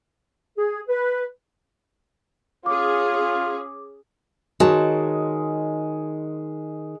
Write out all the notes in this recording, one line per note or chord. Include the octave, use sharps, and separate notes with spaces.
G#4
B4
C#4 F4 G#4 D6
D#3 G#3 F#4 C#5 A5